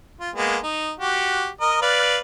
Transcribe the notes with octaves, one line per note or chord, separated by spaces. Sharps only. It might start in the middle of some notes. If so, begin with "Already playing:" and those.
F4
G#3 A#3 B3
D#4
F#4 G4
A#4 D#5
B4 D5 F5